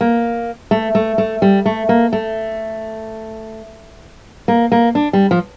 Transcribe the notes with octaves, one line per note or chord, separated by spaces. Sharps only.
A#3
A3
A3
A3
G3
A3
A#3
A3
A#3
A#3
D4
G3
F3